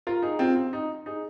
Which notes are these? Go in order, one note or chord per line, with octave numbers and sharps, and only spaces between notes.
F4 A#4
D#4 G#4
C4 F4
C4
D#4
D#4 G#4